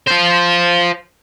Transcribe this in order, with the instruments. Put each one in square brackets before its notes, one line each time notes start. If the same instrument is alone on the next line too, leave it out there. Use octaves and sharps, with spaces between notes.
[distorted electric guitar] F4 C5